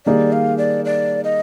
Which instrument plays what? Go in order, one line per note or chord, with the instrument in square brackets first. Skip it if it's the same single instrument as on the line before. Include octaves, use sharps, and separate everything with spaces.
[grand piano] D#3 G3 A#3 D#4 G#4 [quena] D5
[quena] F5
D5
D5
D#5